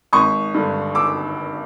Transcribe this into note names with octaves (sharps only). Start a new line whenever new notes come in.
G#1 C#6 D#6
G2 D3
D6 E6